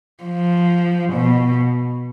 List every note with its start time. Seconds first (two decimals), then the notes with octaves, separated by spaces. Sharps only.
0.24 F3
1.13 B2